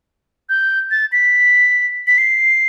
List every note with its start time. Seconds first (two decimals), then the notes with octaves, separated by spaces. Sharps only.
0.49 G6
0.91 A6
1.12 B6
2.07 B6
2.18 C7